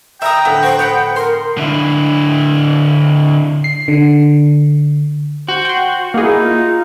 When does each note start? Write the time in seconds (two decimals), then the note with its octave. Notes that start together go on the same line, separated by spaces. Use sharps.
0.22 E5 G5 A#5 B5 D#6
0.45 A2 D3 F3 B3
0.63 F#4 C5
0.79 B3 F#5
1.16 A#4 C6
1.58 D3 E4
3.64 C7
3.88 D3
5.48 F#4 C5
5.65 G5 C6
6.14 A#3 D#4 E4 G#4
6.43 F4